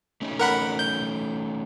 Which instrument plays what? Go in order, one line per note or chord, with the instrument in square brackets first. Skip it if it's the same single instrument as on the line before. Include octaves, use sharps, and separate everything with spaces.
[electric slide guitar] A3 C#4 D#4
[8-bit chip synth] A#4 F#5 B5
G6